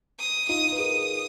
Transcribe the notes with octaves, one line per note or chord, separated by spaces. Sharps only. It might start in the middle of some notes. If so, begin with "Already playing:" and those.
D#6
D#4 F4 D#6
B4
G#4 A#4 D#6